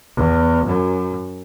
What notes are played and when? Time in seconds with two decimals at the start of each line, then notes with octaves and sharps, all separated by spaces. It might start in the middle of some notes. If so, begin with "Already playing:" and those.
0.16 E2
0.66 F#2